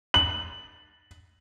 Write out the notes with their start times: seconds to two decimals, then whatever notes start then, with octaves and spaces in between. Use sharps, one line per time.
0.14 F#7